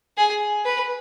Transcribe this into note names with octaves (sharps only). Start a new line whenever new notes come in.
G#4
B4